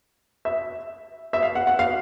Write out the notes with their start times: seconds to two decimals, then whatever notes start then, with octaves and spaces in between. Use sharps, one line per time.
0.45 E5
1.33 E5
1.43 F5
1.55 F#5
1.67 F#5
1.79 F5